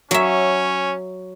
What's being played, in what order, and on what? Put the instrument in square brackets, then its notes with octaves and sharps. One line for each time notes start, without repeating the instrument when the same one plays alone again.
[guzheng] F#3 E5 [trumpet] C#4